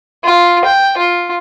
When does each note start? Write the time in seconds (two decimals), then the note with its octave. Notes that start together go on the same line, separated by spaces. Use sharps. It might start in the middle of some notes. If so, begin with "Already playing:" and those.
0.24 F4
0.65 G5
0.98 F4